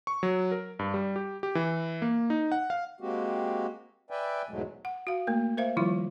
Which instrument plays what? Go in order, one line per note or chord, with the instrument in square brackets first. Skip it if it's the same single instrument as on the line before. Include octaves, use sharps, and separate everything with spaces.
[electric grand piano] C#6
F#3
A#4
G2
G3
G4
G4
E3
A#3
D#4
F#5
F5
[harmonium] G#3 A#3 C4 F#4 G4
B4 D5 E5 G5 G#5
E2 G#2 B2 F#3 G#3 A3
[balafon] F#5
F#4 F5
A3 A#3 A#4
A#4 C5 E5 F5
D#3 F3 G3 E4 F4